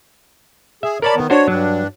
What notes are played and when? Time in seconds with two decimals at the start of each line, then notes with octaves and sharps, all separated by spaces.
0.83 G#4 E5
1.02 A#4 C#5 D5 A5 B5
1.15 D#3 B3
1.30 D4 F#4 C5 C#5
1.48 G2 F#3 D4